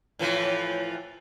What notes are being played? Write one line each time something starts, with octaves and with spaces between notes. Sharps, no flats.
A2 E3 F3